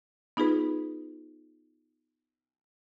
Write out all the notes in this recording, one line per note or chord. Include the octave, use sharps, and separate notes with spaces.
B3 D#4 F4 G#4 B4